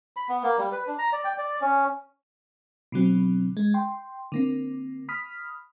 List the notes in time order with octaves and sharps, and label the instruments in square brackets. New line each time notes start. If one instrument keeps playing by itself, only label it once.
[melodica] B5
B3
A#3
G3
B4
D4
A#5
D5
G5
D5
C#4
[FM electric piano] B2 D3 F#3 C4
G#3
G5 C6
D3 A#3 C4
B5 D#6 F6 B6